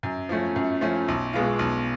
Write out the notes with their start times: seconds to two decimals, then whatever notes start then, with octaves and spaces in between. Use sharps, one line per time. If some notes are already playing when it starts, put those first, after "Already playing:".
0.03 F#2
0.29 F3 A3 C#4
0.56 F#2
0.81 F3 A3 C#4
1.08 B1
1.33 B2 G#3 B3 F4
1.59 B1